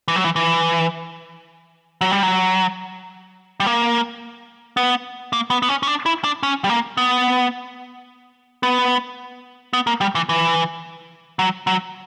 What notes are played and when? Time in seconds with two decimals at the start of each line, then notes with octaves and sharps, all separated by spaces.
0.08 E3
0.16 F#3
0.24 E3
0.36 E3
2.01 F#3
2.12 G3
2.23 F#3
3.60 G3
3.66 A#3
4.77 B3
5.33 A#3
5.51 B3
5.62 B3
5.69 C#4
5.83 C#4
5.87 D4
6.06 E4
6.24 D4
6.43 C#4
6.64 G3
6.70 A#3
6.97 B3
8.63 B3
9.73 B3
9.87 A#3
10.01 G3
10.15 E3
10.29 E3
11.39 F#3
11.67 F#3